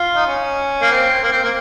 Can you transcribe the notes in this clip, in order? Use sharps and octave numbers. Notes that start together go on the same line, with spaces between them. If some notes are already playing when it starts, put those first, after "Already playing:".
Already playing: F4
D#4
C#4
A#3
C4
A#3
C4
A#3